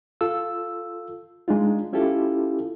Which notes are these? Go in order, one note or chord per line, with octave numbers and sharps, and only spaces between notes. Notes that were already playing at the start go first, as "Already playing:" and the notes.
F4 A4 E6
G#3 D4 D#4 F4
C#4 E4 F4 G4 A4